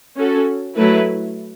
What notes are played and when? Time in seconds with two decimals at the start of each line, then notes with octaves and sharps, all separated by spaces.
0.16 C#4 F#4 A4
0.76 F#3 A3 E4 B4